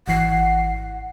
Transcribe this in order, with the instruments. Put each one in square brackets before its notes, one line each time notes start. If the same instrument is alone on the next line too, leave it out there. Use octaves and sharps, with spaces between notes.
[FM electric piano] G#1 E3 C7 [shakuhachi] F#5